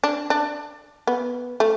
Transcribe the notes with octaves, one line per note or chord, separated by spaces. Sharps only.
D4
D4
B3
A3